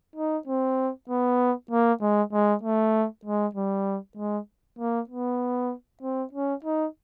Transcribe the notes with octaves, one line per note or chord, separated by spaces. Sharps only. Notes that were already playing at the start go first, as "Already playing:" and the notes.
D#4
C4
B3
A#3
G#3
G#3
A3
G#3
G3
G#3
A#3
B3
C4
C#4
D#4